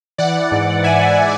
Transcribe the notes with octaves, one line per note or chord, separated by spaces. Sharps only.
E3 D5 F#5
E3
G#2
G#2
E3 E5 G#5
E3